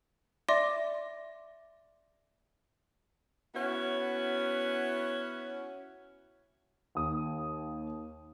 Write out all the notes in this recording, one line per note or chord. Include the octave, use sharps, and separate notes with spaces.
D5 E5 C6 D6 A#6
B3 C#4 E4 F#4 C#5
D#2 D#6